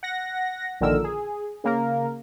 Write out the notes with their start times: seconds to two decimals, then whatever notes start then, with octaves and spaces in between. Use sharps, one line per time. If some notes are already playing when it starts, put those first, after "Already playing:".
0.03 F#5 A#6
0.81 A#1 A#2 D3 D#3 A#4 E6
1.04 G#4
1.64 C#3 A#3 A#4